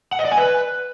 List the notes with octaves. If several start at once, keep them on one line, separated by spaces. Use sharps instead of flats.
F#5
D#5
D5
G#5
B4